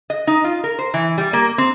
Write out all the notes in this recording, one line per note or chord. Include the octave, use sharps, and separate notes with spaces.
D#5
D#4
F4
A#4
C5
E3
G3
A#3
C4